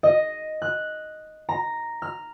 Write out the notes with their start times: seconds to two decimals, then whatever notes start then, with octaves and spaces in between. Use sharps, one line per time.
0.03 D#5
0.62 F#6
1.49 A#5
2.02 F6